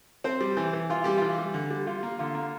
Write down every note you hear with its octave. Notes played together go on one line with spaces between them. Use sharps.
C4 C5
G3
E3
E3
E3 F4
G3 G4
E3 F4
G3
D3
G3
G3 F4
A#3
D3 F4
A#3